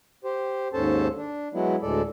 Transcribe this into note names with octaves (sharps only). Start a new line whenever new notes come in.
G4 C5
D#2 G#2 C#4 A4 C5 A5
D4
F#3 G#3 B3 E4
D2 A2 G#3 A4 D5